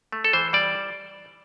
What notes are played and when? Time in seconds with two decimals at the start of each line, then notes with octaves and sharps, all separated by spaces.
0.12 A3
0.24 A4
0.33 E3 C5
0.53 G3 D5